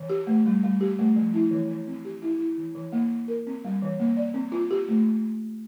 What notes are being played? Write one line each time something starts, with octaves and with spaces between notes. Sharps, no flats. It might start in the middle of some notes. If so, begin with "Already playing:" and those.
Already playing: E3
G4
A3
G3
G3
G4
A3
F3
E4
E3
E3
C4
G4
E4
E4
E3
E3
A#3
A#3
A#4
C4
G3
E3
A#3
D5
C4
F4
G4
A3